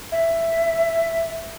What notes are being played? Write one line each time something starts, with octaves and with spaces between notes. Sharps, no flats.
E5